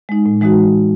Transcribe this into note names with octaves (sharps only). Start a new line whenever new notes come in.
G#3 D#4
A2
E3 G#3 D#4 F#4